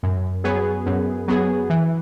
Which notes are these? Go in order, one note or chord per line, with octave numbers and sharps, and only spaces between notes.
F#2
F#3 B3 G#4
F#2
F#3 B3 G#4
E3